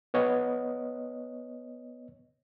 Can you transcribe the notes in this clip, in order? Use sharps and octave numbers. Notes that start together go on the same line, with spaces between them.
B3 C#5 D#5